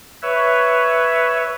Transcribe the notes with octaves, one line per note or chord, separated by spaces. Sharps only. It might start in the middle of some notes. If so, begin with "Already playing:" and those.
B4 C#5 E5